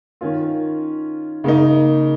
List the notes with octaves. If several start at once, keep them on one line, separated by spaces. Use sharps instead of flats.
D#3 C#4 F4
C#3 A#3 D#4